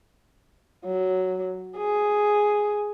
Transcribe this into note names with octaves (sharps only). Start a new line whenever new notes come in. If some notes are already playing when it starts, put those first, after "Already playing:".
F#3
G#4